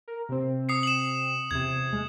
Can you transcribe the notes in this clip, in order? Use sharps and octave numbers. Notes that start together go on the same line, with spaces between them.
A#4
C3 C4
D#6 C7 C#7
E7 F#7
E2 C3 G#6
G#3